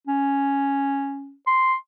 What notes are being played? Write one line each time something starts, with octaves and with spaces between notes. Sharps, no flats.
C#4
C6